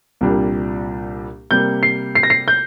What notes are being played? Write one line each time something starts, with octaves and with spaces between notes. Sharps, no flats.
C2 A#2 G3 A#3 D4
C3 G3 A#3 G6
C7
C7
A#6
C7
G6